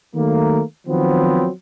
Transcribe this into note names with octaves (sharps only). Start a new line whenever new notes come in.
D#3 F#3 A3 A#3
D#3 F3 F#3 B3 C4